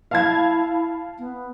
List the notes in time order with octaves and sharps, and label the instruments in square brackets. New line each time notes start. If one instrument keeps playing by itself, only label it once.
[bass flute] E4 [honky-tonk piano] F5 A5 G#6
[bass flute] B3